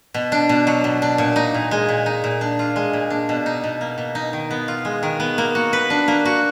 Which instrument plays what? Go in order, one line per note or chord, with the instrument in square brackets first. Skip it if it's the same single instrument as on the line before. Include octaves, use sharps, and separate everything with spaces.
[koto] B2
D4
B2
F#3
B2
D4
A#2
D#4
A#2
G#3
A#2
D#4
A#2
D4
F4
G#3
A#2
D4
B2
D#4
B2
A#3
B2
D#4
D#3
B3
F4
G#3
D#3
B3
A#3
F#4
B4
D4
A#3
F#4